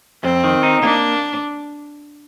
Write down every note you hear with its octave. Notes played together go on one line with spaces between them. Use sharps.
F2 C4
D#3
D#4
A#3 D4